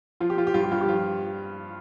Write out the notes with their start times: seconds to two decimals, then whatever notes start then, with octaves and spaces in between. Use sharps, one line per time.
0.20 F3 F4
0.30 G4
0.37 F3 F4
0.47 G4
0.54 G2 F4
0.64 G4
0.71 G2 F4
0.81 G4
0.88 F3 F4